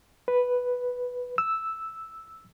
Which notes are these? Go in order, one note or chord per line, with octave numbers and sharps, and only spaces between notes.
B4
E6